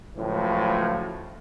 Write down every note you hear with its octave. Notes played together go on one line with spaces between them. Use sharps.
C#2 A2 F3 F#3